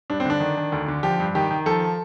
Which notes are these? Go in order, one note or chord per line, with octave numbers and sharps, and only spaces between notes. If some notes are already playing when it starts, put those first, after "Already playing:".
G2 D4
C4
D3 D4
D#3
D#3
D2
D3
F3 G4
G2
D#3 G4
D#3
F3 A4